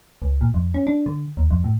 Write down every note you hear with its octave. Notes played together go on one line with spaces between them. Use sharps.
C#2
A#2
F2
C#4
D4
D3
D#2
F2
A2